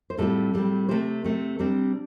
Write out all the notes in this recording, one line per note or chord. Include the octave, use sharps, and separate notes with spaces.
C5
A2 G3 C4 F4 A4
A2 G3 C4
C3 A3 C4 G4 C5
C3 A3 C4
C3 G3 C4 D4